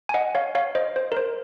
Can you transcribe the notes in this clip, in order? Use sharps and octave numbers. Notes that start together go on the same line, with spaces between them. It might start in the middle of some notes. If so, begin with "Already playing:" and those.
G#5
D#5 F#5
C#5 F5
C#5 F5
C5 D#5
C5
A#4
C5